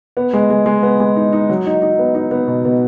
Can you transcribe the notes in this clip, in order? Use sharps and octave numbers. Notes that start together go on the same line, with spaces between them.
B3
G#3
G#3
G#3
B3
G#3
D#4
D#4
F#3
D#4
D#4
B3
D#4
B3
B2
B2